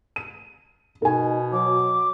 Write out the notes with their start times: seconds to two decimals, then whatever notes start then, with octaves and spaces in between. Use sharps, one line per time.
0.16 D#7
1.02 B2 D#4 A#4 G#5
1.53 F#3 D6